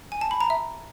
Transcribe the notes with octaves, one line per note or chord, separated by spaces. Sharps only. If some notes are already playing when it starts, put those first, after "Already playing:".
G#5
A5
B5
A#5
E5